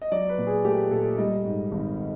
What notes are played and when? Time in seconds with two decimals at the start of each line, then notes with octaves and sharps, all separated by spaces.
0.02 D#5
0.12 F#3 D5
0.29 B4
0.38 A#2
0.47 G#4
0.65 A3 G4
0.91 A#2 A4
1.18 G3 D#5
1.44 G#2
1.71 G#1